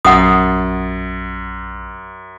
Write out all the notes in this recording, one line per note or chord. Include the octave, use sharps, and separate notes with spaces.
A#1 F#2 F#5 D#6 A6